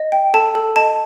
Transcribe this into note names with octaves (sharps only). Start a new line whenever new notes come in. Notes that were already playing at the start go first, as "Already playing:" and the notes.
Already playing: D#5
G5
A4 A5
A4
D#5 A5